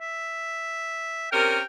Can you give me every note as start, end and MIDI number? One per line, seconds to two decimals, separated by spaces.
0.01 1.31 76
1.31 1.59 48
1.31 1.59 61
1.31 1.59 70
1.31 1.65 79